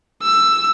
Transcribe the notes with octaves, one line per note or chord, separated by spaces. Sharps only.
E6